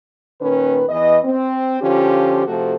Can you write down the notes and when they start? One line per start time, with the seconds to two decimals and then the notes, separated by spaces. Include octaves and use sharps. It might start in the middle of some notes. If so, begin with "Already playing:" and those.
0.40 A#2 D#3 C#4 B4
0.89 E2 E3 D#5
1.24 C4
1.81 D3 F3 C#4 F4 G4
2.46 C3 F3 A3 F#4 A4